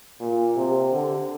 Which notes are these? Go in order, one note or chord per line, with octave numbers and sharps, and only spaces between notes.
A#2
C3
D3